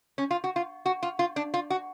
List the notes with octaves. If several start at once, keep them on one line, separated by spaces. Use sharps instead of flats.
C#4
F4
F#4
F4
F#4
F4
F4
D4
F4
F#4